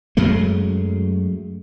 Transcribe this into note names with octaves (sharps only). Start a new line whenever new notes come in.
F#2 F#3 G#3 A3